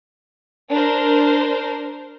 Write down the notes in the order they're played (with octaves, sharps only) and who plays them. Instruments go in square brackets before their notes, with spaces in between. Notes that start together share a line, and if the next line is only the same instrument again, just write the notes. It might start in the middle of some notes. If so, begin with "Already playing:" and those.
[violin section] D4 A#4 C5